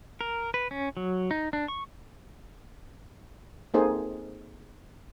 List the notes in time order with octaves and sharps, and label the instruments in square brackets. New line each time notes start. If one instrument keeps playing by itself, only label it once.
[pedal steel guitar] A#4
B4
C#4
F#3
D#4
D4
C#6
[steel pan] A#3 C4 D#4 G#4 A4 C5